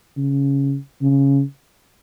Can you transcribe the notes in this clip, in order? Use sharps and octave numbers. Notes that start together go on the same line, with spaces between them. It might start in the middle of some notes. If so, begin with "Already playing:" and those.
C#3
C#3